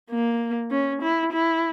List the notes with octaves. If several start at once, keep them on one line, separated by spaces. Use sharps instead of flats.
A#3
C#4
E4
E4